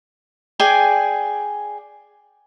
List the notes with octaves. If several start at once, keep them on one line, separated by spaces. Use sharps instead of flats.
G#4 D5 G5 G#5